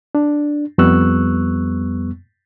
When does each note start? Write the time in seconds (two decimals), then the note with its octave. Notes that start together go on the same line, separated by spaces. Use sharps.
0.15 D4
0.78 F2 G3 B3 C#6 E6 F#6